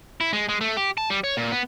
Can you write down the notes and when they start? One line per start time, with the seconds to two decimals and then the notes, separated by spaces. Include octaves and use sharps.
0.21 E4
0.33 G#3
0.49 G#3
0.61 A3
0.77 G4
0.98 A5
1.10 G3
1.24 C#5
1.37 A#2
1.52 B3